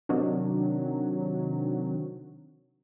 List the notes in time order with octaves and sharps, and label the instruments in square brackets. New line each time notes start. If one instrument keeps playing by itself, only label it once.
[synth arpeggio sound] C3 D#3 F#3 C4 D4